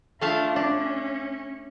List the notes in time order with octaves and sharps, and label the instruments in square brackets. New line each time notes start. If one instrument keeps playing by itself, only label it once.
[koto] A3 F5 A5 [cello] D4 F4
[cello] C#4 [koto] D4